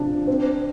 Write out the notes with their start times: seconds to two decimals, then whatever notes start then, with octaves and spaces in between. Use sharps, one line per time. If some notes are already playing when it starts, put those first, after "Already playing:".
Already playing: C3 F3 D4
0.27 C4